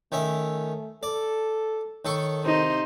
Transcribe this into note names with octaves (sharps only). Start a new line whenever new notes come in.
D#3 A3 C#4 E5
A4 D5
D#3 A4 C#5 C#6
C3 D#4 C5